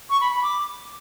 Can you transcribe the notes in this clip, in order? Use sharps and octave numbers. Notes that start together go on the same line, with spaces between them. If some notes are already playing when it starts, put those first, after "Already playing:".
C#6
B5
B5
D6